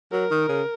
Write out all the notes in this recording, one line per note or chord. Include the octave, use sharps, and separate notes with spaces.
F#3 A#4
D#3
C#3